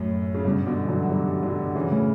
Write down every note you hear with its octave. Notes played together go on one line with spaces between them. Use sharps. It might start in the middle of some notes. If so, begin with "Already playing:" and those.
Already playing: F#2 A2
C#3
G2 B2
B2 D3
E3
D3 F#3
F#3
E3 G3
D3 F#3
C#3 E3
A2 C#3